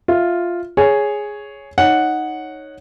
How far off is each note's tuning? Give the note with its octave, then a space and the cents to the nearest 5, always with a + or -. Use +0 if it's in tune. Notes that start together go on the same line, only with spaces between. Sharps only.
F4 +0 E5 +0
G#4 +0 C#5 +0
D#4 +0 C#5 -5 F#5 -5